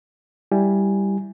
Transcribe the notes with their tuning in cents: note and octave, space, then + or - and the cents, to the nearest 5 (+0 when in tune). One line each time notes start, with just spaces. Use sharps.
G3 +0 E4 +0 G#5 +0